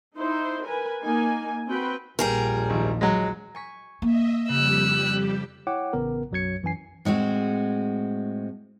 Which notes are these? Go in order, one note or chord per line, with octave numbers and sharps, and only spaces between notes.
D#4 E4 C5
A#4 B4 G#5
A#3 D#4 G#5
C4 F#4 B4 G5 B5
A#1 D#2 F3 G3 G#4 A#4
G#1
F#3 G#3
G#5 C#6 B6
A#3 D#5 E5
F2 C#3 G3 G4 E6 F#6
E4 C#5 F#5 G5 D6
A1 C#3 B3 A#4
B1 F#2 F#3 C#5 G#6 C#7
F#2 E3 C#4 G#5 C7
A2 G#3 C4 F#4